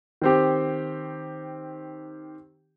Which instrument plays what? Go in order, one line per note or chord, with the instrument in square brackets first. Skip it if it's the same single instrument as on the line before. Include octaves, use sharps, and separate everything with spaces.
[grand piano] D#3 C4 G4